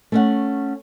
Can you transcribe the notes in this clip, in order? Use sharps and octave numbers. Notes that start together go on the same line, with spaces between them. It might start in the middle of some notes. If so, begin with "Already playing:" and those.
A3 C#4 F#5